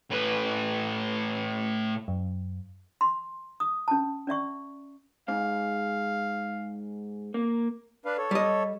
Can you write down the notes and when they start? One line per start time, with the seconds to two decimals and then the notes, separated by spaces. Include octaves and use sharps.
0.11 A2 B4
2.08 F#2
3.01 C6
3.60 D#6
3.88 C#4 A5
4.27 C#4 D5 E5 C#6
5.28 G#2 F5
7.34 A#3
8.05 D4 B4 F5
8.18 A4 C#5
8.31 G3 D#5